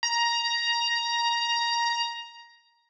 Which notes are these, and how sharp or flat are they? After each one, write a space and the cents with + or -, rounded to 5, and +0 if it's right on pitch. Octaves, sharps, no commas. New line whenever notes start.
A#5 +10